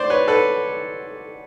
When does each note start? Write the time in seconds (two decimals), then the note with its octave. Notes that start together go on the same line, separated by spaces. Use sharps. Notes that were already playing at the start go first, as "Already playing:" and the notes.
Already playing: C5 D5
0.10 B4 C#5
0.28 A4 B4